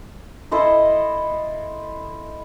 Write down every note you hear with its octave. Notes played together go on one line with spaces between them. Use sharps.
E4 A4 C5 D#5